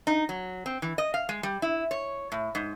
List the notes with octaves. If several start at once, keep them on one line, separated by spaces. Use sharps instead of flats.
D#4
F#3
C4
E3
D#5
F5
G#3
G3
E4
C#5
A2
G#2